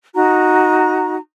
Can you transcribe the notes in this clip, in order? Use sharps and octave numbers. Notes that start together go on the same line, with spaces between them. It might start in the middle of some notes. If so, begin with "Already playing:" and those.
D#4 F#4 A#5